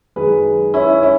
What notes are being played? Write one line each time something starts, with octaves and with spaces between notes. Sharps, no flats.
F#2 D#3 G#3 G#4 B4
C#4 E4
C#4 E4